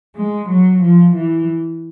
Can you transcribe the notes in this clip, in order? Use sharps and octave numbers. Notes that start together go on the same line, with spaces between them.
G#3
F#3
F3
E3